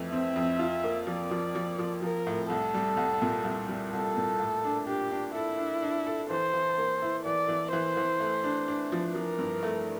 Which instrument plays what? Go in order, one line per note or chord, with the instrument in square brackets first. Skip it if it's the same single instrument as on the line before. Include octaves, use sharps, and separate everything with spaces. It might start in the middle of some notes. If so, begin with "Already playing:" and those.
Already playing: [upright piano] F2 E3 A3
[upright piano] C4 [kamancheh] E5
[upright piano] F2
F4
A#3
[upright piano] F3 [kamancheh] D5
[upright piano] F3
F3
F3
[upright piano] F3 [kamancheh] A#4
[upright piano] A2
[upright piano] C2 [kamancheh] A4
[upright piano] G3
C2
A#2
C2
G3
[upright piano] C2 [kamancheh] A4
[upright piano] A#2
A2
D4
[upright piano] D4 [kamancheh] G4
[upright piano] D4
[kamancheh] E4 [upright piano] A4
[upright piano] D4
D4
A4
[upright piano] E3 [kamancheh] C5
[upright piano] E3
A#3
E4
[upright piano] E3 [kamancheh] D5
[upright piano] E3
[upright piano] E3 [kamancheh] C5
[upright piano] E3
A3
D4
D4
F3
[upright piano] F3 [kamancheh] A#4
[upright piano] G2
A3